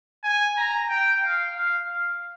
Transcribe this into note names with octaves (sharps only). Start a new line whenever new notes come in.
G#5
A#5
G5
F5
F5
F5